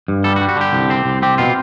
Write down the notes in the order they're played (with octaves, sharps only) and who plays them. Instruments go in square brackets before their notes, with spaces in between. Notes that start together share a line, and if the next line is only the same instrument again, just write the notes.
[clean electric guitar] G2
G3 A4
F#4
G3
F#4
D3 G4
C2
C4
C2
C4 G4
B2 F4